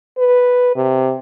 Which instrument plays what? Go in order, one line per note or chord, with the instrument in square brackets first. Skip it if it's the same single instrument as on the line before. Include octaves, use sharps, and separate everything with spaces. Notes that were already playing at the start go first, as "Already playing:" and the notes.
[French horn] B4
C3